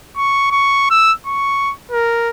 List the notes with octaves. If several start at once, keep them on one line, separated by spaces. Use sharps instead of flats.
C#6
C#6
E6
C#6
A#4